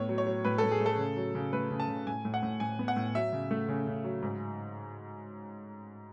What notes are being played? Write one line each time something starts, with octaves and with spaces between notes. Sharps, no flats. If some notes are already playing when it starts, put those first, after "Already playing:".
Already playing: A2 B3 C#5
F#3
C#5
F#3
A2 B4
A4
A2
G#4
A3
A4
C#3
F#3
C#3
A3 B4
C#3
A5
C#3
A2 G#5
A2
F#5
A2
A2 G#5
B3
F#5
A2
F#3 E5
C#3
A3
C#3
C#3
F#3
G#2